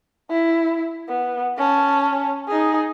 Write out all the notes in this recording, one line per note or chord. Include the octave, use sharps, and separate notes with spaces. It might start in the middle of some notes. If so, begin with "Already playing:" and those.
E4
B3
C#4 A5
D#4 G#4